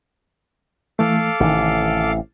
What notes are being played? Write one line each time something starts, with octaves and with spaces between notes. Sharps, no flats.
E3 A3 A4 F5 D6
A1 C3 D#3